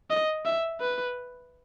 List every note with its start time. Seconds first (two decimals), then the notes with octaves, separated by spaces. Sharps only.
0.10 D#5
0.45 E5
0.81 B4